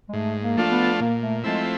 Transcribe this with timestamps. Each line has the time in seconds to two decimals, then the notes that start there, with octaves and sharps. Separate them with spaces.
0.09 G#3
0.13 G#2 A3
0.42 A#3
0.57 F3 A3 D4 F4
0.71 B3
1.00 A#2 A#3
1.22 A3
1.44 F3 G#3 A3 C4 E4